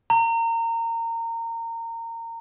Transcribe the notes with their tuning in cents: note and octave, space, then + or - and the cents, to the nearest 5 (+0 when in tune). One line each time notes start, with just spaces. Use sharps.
A#5 -25